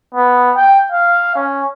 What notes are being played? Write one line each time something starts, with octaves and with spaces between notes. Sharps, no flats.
B3
G5
F5
C#4